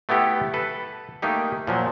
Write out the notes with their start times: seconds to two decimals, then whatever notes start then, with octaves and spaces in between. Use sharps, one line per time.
0.09 A3 B3 E4 G4 A4
0.54 A4 B4
1.22 A3 A#3 D#4 G4
1.67 A#2 F3 F#3